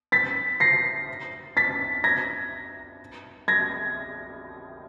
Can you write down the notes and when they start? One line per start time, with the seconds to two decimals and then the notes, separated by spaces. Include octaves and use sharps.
0.12 A6 B6
0.60 A#6 C7
1.57 A6 B6
2.04 G#6 A#6
3.48 G#6 A#6